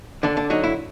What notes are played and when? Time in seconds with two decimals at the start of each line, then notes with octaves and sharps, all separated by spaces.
0.23 D3 D4
0.37 D4
0.50 F#3 D#4
0.63 E4